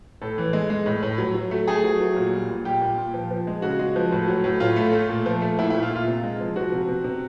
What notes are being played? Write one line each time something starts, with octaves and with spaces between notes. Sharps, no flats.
A2 A4
E3
G#3
G#3
A2
A2
F#3
F#3
A3
A3 G#4
F#3
F#3
A#2
G3
A#2
G3 G4
A#2
A#2
F3
F3
G#3
C#3 F#4
G#3
F3
A2
F#3
A2
A2 F4
A3
A3
A#2
F3
A3
A#2 E4
E4
A#2
F4
A#2
F4
C3
G#3
F3
F3 F#4
C3
C3
C3